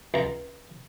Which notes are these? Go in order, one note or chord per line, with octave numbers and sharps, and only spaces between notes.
C#2 A#5